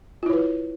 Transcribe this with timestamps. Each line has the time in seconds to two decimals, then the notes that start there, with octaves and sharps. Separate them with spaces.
0.23 F4
0.26 E4
0.30 C#5
0.33 B4